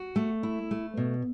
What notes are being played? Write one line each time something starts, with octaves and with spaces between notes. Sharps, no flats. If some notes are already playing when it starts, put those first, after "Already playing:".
Already playing: F#4
A3
E4
A3
B2